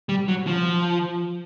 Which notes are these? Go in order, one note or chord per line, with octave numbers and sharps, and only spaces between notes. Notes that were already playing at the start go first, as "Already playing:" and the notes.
G3
F#3
F3